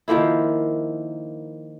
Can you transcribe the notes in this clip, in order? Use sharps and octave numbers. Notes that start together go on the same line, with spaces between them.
D#3 F3 A#3 E4